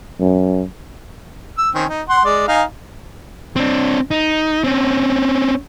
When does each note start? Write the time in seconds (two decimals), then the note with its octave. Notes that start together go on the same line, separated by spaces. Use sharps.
0.21 F#2
1.58 E6
1.75 D#3 C4 C#4
1.89 D#4
2.09 F#5 C6
2.25 G#3 D5
2.48 D#4 F5 G#5
3.56 C4 D4
4.11 D#4
4.64 C4 C#4